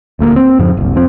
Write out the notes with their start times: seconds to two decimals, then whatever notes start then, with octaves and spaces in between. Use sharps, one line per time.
0.19 D#1 D2 A3 A#3
0.36 C4
0.59 F2 G#2 C#3 F3
0.77 F#1 C2
0.95 F2 F3 C4